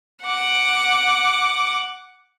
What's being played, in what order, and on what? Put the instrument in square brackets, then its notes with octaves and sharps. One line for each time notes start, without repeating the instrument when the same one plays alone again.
[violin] F#5 D6